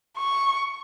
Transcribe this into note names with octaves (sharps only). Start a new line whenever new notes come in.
C#6